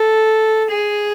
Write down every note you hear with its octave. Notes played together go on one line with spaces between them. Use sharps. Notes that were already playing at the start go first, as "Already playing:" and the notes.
Already playing: A4
G#4